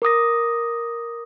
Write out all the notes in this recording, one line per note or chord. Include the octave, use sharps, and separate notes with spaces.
A#4 D6 D#6 A#6